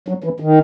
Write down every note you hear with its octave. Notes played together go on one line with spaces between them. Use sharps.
F#3
E3
D#3